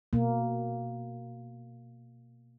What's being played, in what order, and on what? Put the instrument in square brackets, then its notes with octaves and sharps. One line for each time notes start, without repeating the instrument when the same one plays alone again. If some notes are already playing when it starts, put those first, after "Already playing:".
[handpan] B2 A#3